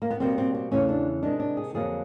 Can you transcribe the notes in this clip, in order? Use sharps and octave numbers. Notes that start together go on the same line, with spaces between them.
A#3
B3
B2 G3 A#3 C4
C4
C4
E2 C#3 E3 A3 C#4
D4
C3 D#3 G#3 D4
D4
G#4
F2 D3 F#3 A#3 G#4